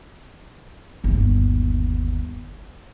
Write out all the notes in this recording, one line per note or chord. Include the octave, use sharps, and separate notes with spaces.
G1 D#2